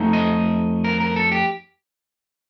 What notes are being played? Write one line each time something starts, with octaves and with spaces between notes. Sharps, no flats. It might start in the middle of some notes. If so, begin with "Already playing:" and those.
Already playing: F2 A3 D#4
D#5
A#4
A#4
A4
G4